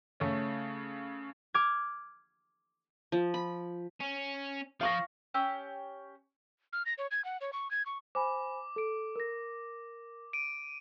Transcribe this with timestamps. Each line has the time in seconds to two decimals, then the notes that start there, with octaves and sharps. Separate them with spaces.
0.20 C#3 A3 C#4
1.54 D6 F6 G#6
3.12 F3
3.34 B5
4.00 C#4
4.81 F3 F5 C#6 A#6
5.34 C#4 G4 E6
6.73 F6
6.86 A#6
6.98 C#5
7.11 G#6
7.25 F#5
7.41 C#5
7.53 C#6
7.71 G#6
7.86 C#6
8.15 C5 G#5 B5 D6
8.76 A4 D7
9.16 A#4 A#6
10.33 D7 D#7